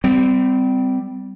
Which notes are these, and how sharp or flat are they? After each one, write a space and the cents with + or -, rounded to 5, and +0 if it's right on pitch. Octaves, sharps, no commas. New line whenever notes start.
G3 +0 C4 -30